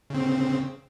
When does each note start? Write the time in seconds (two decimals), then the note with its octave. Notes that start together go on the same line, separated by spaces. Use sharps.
0.10 C#3 C4